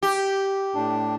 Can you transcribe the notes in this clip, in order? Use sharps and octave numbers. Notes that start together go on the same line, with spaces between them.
G4
A2 D4